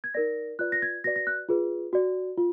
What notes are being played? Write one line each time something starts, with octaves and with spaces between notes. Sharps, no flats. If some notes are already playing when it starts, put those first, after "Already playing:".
G#6
D#4 A#4 D5 A#6
F4 B4 D5 F#6
A#6
G#6
F#4 B4 D5 A#6
A#6
F#6
F4 G#4 B4
F#4 D5
F4